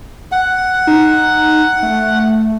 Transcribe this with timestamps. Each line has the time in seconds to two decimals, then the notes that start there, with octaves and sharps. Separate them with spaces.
0.32 F#5
0.87 D#4
1.83 A3